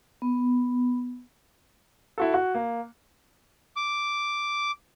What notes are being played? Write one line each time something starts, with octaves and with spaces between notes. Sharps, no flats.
B3
E4 F#4 A4
F#4
A#3
D6